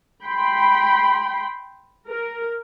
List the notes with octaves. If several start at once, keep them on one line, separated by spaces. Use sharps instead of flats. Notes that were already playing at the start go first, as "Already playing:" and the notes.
G5 B5 C6
A#4